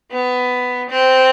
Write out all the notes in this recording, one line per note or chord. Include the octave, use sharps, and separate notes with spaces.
B3
C4